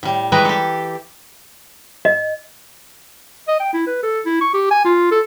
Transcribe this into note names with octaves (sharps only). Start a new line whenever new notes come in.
A2 G3
E3 G3 G#3 B4 A#5
G4 A4
D#5
D#5
G5
E4
B4
A4
E4
C#6
G4
G#5
F4
A4